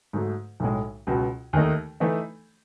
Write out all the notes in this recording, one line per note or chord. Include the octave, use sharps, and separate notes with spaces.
G#2 F#3 A3
B1 A2 G#3
C#2 B2 F#3
D#2 D#3 A3 D#4
E3 A3 D#4